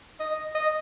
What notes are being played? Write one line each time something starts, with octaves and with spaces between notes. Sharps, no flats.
D#5
D#5